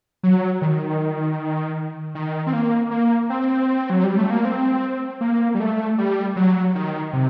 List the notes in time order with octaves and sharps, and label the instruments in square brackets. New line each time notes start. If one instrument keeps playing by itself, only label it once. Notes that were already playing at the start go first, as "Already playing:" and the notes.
[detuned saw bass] F#3
D#3
D#3
C4
A#3
A#3
C4
F#3
G3
A3
A#3
C4
A#3
G3
A3
G3
F#3
D#3
C3